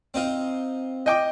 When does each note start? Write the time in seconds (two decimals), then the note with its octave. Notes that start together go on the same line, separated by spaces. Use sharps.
0.14 C4 D#4 F4
1.06 D#5 G5 D6